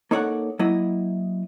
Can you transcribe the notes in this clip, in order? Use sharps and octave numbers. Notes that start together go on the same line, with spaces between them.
A#3 D#4 A4 C#5 D5 F#5
F#3 A#3 E4 D#5